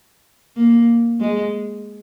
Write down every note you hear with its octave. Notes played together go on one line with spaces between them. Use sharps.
A#3
G#3